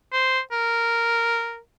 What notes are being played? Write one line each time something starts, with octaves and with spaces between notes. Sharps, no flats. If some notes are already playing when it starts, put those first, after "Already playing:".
C5
A#4